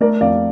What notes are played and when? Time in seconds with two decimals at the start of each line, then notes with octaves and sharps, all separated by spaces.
0.01 A3 A#4 D5
0.21 F2 D5 F5